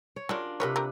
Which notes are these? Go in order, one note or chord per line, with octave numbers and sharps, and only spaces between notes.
C#5
C#3 F#3 G3 D4 F4 A#4
C3 F#3 A#4 B4 C#5
A3 G4 A#4